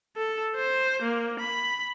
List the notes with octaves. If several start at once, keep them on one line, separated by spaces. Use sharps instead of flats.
A4
C5
A#3
B5